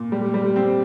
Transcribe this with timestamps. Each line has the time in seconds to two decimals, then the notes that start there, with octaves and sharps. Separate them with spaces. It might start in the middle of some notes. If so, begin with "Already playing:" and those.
Already playing: A#2
0.12 G3
0.34 G3
0.56 C4